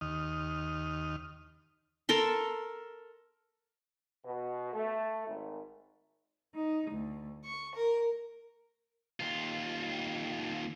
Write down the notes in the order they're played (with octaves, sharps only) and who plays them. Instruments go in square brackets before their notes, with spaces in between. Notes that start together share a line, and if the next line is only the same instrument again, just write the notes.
[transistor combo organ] D#2 D#5 F6
[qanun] A4 A#4 C6
[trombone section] B2
A3
G#1
[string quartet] D#4
D2
C#6
A#4
[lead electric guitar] D#2 F4